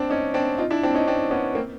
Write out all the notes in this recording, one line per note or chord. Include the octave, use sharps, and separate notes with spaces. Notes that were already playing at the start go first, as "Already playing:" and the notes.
Already playing: C4 D4
C#4 D#4
C4 D4
D#4 F4
D4 E4
C4 D4
C#4 D#4
C4 D4
B3 C#4
A#3 C4